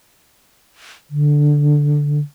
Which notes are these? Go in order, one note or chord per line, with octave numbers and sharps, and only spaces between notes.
D3